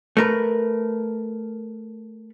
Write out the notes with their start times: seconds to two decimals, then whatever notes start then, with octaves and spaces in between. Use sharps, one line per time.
0.17 A3 A#4 B4